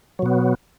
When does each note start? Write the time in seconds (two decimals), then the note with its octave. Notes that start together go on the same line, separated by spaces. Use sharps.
0.19 F#3
0.22 B2
0.26 B3